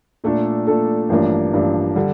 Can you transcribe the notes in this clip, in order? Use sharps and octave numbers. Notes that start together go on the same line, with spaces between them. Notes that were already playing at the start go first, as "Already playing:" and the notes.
A#2 A3 D4 A4
A#2 A3 D4 A4
A1 G2 F3 A#3 D4
A1 G2 F3 A#3 D4
D3 G3